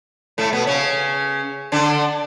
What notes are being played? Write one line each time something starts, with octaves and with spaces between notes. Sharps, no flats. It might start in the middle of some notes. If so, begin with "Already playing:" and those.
A2 A3
B2 B3
C#3 C#4
D3 D4